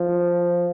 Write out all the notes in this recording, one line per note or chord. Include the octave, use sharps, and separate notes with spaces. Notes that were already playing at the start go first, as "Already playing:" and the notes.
Already playing: F3